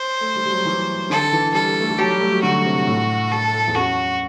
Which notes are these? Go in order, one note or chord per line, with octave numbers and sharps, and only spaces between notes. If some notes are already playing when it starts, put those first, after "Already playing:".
Already playing: C5
A3
G3
G3
F#3
E3
D3 A4
E3
G3 A4
A3
G3
F#3 G4
G3
A3
F#3
D3 F#4
C3
A2
A4
E2
F#2 F#4